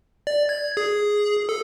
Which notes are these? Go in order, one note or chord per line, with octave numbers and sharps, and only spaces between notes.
D5
G#6
G#4
A4